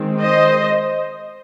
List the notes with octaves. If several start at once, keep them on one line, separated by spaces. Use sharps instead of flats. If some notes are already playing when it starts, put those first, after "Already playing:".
Already playing: D#3 G#3 C4
C5 D#5